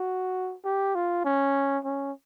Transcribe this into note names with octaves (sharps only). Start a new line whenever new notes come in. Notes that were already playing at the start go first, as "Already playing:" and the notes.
Already playing: F#4
G4
F4
C#4
C#4